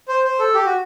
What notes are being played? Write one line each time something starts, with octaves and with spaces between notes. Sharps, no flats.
C5
C5
A4
G4
F#4